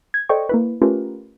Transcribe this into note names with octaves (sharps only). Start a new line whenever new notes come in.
G#6
A4 C5 D5 D#5 G5 C#6
A#3 E4 B4
A3 C#4 F4 G4 A#4 B4